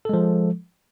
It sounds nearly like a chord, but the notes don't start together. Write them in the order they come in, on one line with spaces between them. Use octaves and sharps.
A4 G#3 F3